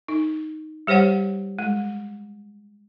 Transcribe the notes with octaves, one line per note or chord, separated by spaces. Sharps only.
D#4
G3 G4 C5 C#5 F#5
G#3